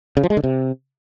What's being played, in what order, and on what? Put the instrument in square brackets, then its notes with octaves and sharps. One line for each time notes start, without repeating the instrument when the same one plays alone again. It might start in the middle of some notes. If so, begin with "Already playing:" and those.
[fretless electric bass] C#3
F3
G#3
D3
C3